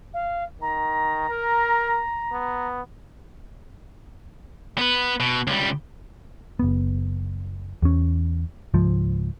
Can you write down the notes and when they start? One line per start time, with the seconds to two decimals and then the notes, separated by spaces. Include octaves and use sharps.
0.13 F5
0.61 D#3 A#5
1.30 A#4
2.33 B3
4.78 B3 B4
5.20 B2
5.47 C#2 G3
6.59 F#1 B3
7.82 E2 C#4
8.74 C#2 G#2 F3